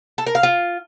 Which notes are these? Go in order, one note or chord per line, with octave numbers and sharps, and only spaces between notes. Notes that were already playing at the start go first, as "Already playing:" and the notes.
A4
A#4
F5
F4